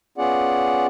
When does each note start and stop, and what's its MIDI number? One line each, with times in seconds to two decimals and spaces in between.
0.18 0.87 59
0.18 0.87 61
0.18 0.87 65
0.18 0.87 68
0.18 0.87 74
0.18 0.87 78